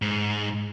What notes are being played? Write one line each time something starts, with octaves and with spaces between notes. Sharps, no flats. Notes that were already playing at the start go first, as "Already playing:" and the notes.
G#2